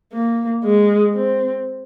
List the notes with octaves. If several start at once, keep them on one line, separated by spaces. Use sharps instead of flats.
A#3
G#3
C4